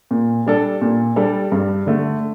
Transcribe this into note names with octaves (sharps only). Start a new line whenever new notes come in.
A#2
G3 D4 A4
A#2
G3 D4 A4
G2
D3 A3